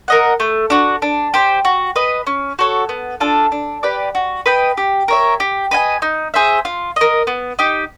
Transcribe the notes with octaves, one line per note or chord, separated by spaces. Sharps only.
A#4 D#5 F#5
A3
D4 F#4
D4
G4 C5
F#4
B4 D#5
C#4
F#4 A4 C#5
B3
D4 F4 A4
D4
G4 B4 D5
F#4
B4 D#5 G5
G4
A#4 C#5 E5
G4
B4 D#5 G#5
D#4
G#4 C5 E5
F4
A#4 D#5
B3
D#4 G4